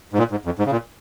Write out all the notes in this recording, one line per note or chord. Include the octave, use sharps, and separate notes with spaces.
G#2
A#2
G#2
F2
G#2
C#3
A#2